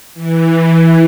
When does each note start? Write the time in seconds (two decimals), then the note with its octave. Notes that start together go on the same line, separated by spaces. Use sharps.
0.14 E3